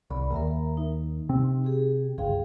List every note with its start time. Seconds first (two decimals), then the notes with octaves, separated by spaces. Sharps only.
0.10 C2 D5 B5
0.32 D#2 A#4 E5 A#5
0.77 D#4
1.29 C3 C4
1.64 G4 G#4
2.18 G1 C#2 G#4 F5 G5